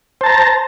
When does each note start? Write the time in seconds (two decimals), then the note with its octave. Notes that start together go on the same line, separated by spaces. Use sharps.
0.21 C5
0.24 A5
0.26 A#5